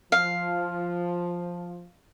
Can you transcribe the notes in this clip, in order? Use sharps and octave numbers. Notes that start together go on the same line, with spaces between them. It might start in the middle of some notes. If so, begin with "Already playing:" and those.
F3 F5